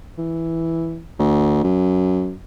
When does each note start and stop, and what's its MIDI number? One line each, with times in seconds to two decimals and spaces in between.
0.18 1.01 52
1.19 1.64 38
1.64 2.34 42